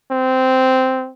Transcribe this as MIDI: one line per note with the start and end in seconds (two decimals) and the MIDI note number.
0.11 1.11 60